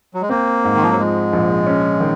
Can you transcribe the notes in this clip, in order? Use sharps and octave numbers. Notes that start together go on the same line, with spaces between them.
F#3
G#3
A#3 C4
G#2
D#3
F3
F#3
F3 G#3
A#1
C#4
D#3